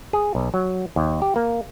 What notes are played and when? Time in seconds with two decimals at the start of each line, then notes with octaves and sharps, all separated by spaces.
0.13 G#4
0.35 B1
0.54 F#3
0.96 D#2
1.22 G4
1.36 A#3